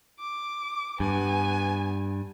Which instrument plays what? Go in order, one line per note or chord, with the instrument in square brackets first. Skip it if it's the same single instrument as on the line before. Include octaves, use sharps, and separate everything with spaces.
[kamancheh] D6
[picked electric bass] G2 [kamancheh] B3 G#5